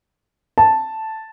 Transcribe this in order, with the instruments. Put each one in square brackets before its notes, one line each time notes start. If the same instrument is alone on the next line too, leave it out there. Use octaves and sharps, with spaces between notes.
[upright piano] A5